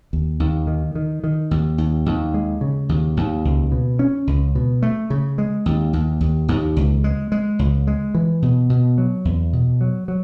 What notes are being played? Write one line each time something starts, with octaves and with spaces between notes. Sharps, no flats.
D#2
D#2
D#3
D#3
D#3
D#2
D#2
D#2
G#3
C#3
D#2
D#2
C#2
B2
C#4
C#2
B2
A3
C#3
G#3
D#2
D#2
D#2
D#2
C#2
G#3
G#3
C#2
G#3
E3
B2
B2
F#3
E2
B2
F#3
F#3